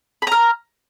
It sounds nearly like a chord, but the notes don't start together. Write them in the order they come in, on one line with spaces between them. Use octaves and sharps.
B5 A#5 F6